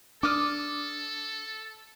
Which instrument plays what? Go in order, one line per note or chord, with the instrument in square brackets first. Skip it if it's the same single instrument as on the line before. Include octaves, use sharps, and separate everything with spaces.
[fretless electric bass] D4 [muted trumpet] A4 [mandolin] D6 D#6 F6